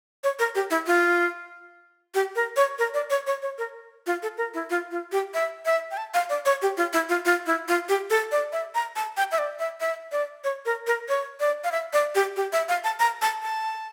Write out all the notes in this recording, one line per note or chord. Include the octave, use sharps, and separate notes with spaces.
C#5
A#4
G4
E4
F4
G4
A#4
C#5
A#4
D5
C#5
C#5
C#5
A#4
F4
A4
A#4
E4
F4
F4
G4
E5
E5
G5
A5
F5
D5
C#5
G4
F4
E4
F4
F4
E4
F4
G4
A4
D5
E5
A#5
A5
G5
E5
D5
E5
E5
D5
C#5
A#4
A#4
C#5
D5
F5
E5
D5
G4
G4
E5
F5
A5
A#5
A5
A5